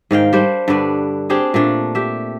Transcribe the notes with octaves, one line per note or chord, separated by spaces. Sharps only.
G#2 D#3 F5 G5
G3 D4 C5
G2 D3 D4 B4
C4 D4 G4 G#4
A#2 A3 D4
G4 E5